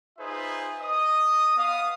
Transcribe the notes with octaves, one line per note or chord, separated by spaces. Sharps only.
D#4 F4 G#4 B4 C5 E5
D#5 D#6
B3 F5 D#6